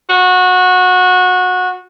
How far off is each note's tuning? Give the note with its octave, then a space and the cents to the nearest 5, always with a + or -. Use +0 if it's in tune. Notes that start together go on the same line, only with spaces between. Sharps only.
F#4 -20